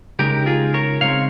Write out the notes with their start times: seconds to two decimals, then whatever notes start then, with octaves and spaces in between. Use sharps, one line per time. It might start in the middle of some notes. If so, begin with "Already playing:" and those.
0.19 C#3 G#3 C4 D#4 G4 A#4
0.46 F4 G#4
0.74 A#4 C#5
1.01 C#3 G#3 C4 D#4 C#5 F5